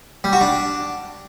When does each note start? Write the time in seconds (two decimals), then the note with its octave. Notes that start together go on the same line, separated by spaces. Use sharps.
0.24 G3
0.33 F#4
0.41 D4